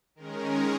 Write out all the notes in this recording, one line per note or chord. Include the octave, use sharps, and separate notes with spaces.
D#3 G#3 C#4 A#4
G#4